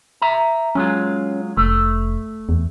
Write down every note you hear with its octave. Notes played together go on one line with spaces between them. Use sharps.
E5 A#5
F#3 G#3 C#4 F4
F1 A3
E2